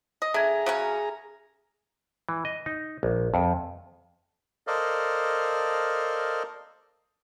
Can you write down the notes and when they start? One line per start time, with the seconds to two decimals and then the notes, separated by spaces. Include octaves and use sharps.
0.22 D#5
0.34 D3 G#4 E5 A#5 G#6
0.66 C#3 F#3 C#4
2.29 E3
2.45 D#5
2.66 D#4
3.03 A#1
3.34 F2
4.67 A4 A#4 C5 D5 D#5 F5